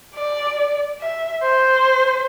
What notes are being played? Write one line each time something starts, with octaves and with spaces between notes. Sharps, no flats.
D5
E5
C5